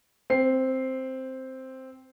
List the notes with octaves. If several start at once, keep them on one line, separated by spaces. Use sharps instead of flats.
C4 C7